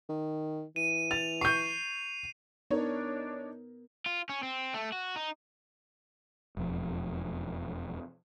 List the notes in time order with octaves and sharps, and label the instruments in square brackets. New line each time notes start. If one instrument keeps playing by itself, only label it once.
[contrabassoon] D#3
[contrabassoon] E3 [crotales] D#7
[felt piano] A6 [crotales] F7
[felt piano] C#6 G6 [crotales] C7 D#7
[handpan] B3 A#4 [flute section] D4 [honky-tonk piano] D#4 C#5
[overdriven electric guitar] F4
C#4
C4
A3
F#4
D#4
[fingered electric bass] E1 F2 F3